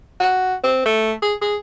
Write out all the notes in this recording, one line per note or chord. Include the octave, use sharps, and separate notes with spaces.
F#4
C4
A3
G#4
G#4